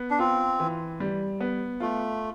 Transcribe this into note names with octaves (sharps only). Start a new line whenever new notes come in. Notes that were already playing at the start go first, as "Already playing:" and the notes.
Already playing: B3
D4
C4 F4
E3
G3
B3
A3 F4